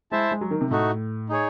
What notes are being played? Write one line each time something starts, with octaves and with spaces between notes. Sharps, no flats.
G#3 E4 C5 E5 A5
G#3
F#3
D#3
C3
A2 A3 D#4 F#4
D#4 G#4 C#5